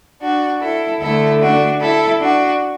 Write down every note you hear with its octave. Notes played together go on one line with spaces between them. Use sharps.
D4 F#4
E4 A4
D2 D3 A3 E4 A4
D4 F#4
E4 A4
D4 F#4